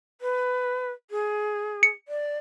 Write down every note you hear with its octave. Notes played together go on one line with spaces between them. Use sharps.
B4
G#4
C#7
D5